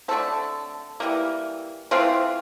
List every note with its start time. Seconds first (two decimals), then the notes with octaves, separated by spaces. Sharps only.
0.08 D3 A3 C4 A4
1.00 E3 G3 A#3
1.91 E3 A3 C4 F4